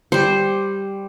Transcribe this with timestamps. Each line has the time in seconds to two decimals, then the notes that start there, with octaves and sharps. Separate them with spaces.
0.12 G3 C5